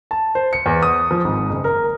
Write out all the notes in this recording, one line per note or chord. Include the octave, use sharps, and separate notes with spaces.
A5
C5
C#7
E2
D#6
F3
G#1
F#1
A#4